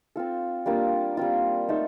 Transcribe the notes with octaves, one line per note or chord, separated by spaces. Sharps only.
C4 F4 A4
G3 A#3 D4 F4
G3 C4 F4
A3 D#4 A4 C5